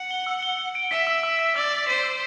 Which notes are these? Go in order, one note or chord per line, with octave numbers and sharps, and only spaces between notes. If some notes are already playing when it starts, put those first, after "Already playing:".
Already playing: F#5
G7
E6
G7
G7
D7
E5 B6
E6
E6
B6
D5 E6
B6
C5 B6
E6